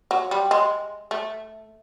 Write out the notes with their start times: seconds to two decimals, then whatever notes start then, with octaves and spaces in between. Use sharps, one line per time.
0.11 F#3
0.31 G3
0.51 G#3
1.11 A3